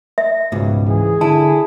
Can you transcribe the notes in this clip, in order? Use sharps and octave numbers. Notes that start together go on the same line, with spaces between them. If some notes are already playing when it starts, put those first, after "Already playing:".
E5
C#2 G#2 B2
E3 G#4
D3 E4 A5